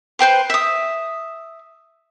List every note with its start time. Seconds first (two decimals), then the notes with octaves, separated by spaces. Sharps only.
0.19 B4 C5 G5 C6
0.50 E5 D#6